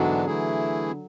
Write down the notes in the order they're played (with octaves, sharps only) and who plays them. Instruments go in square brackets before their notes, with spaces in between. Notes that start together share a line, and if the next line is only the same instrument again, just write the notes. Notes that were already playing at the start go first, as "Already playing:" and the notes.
Already playing: [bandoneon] G#2 E3 G#3 B3 D4 [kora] D3 F#3
[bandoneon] E3 A3 E4 G#4